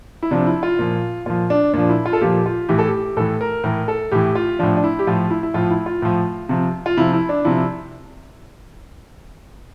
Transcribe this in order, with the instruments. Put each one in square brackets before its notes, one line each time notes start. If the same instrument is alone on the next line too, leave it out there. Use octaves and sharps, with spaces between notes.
[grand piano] E4
C3 F3 D4
E4
F4
A#2 F3
A#2 F3 F4
D4
A#2 F3 D4
E4
F4
A4
A#2 F3 G4
F4
A2 E3 G4
A4
G4
A2 E3 A4
A#4
A2 E3 A#4
A4
A2 E3 G4
F4
A2 F3 D4
D4
E4
G4
A2 F3 F4
E4
E4
A2 F3 F4
E4
F4
A2 F3
C3 F3
F4
C3 F3 E4
E4
D4
C3 F3 E4